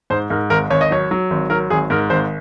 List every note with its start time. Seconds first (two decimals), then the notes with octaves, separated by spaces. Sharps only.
0.10 G#2 C5
0.30 G#2 A#4
0.50 G#1 A#4
0.70 G#1 C#5
0.81 D#5
0.91 F#3 C#5
1.11 F#3
1.31 G#1
1.50 F#3 A#4
1.70 G#1 G#4
1.90 G#2 A#4
2.10 G#1 C5